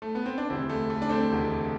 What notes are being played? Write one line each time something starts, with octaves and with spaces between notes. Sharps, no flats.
A3
B3
C4
D4
E1 D2 C3 E3 C4 E4
A3
A3
D4
A3 C4
E1 D2 C3 E3